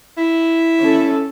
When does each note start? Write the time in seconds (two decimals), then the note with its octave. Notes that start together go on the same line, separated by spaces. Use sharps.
0.18 E4
0.80 C#4 A4